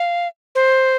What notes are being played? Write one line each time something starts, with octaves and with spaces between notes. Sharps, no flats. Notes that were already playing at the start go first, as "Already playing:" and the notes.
Already playing: F5
C5